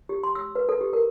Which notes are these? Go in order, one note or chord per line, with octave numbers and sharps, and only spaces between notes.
G4
C6
E6
B4
A4
G4
A#4